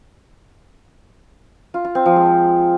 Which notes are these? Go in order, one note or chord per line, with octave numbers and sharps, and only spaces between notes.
F4
F4
C4
F3
G#3